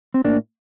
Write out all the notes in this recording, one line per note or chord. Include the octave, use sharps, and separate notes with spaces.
C4
A2 A#3 D4